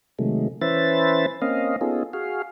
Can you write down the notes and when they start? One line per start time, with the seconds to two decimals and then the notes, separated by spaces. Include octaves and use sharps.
0.19 C3 D#3 F#3 G#3 A3
0.61 E3 C#4 B4 C5 E5 A6
1.42 A#3 C4 C#4 D#5 F5
1.81 B3 C#4 D#4 F4 G#4 A4
2.13 F#4 G#4 F5